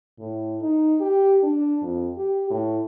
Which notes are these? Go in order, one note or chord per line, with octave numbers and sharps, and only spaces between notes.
A2
D#4
G4
D4
F2
G4
A2